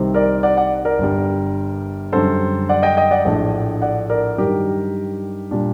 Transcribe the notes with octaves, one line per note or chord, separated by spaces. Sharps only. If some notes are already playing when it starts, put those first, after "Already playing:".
Already playing: C2 C3 D#3 G3 C4
A#4 D5
D5 F#5
D5 F#5
A#4 D5
G1 G2 D3 G3
F#2 D3 G3 A4 C5
D5 F#5
D#5 G5
D#5 G5
D5 F#5
A#1 A2 A3 D4
D5 F#5
A#4 D5
G2 D#3 F#3 G4 A#4
A#2 G3 D4